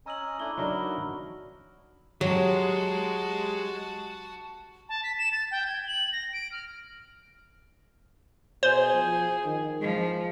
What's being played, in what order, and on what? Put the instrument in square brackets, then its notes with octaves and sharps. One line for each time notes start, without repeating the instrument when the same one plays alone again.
[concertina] C#4 D#5 G#5 [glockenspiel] A#5 E6 F#7
[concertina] A3 D4 E4 [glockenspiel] G7
[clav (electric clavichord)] F#3 D4 D#4 [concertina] F#4 A#4 [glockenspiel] B5
[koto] F#3 [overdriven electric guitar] G#3 [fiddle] F#4 A5 [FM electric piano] G4
[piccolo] A5
B6
E7
A6
G5
G#6
F#7
A#6
D7
F6
[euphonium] B2 [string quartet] G#4 [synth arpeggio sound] C5
[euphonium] F3
D#3
[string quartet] F3 [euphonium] G#3